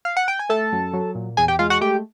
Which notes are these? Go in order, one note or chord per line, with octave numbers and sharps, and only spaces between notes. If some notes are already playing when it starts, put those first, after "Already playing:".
F5
F#5
G5
G#5
A3 A4 A5
F#2
F#3
A#2
E2 G#4 G#5
G4 G5
G#3 F4 F5
F#4 F#5
A3 G4 G5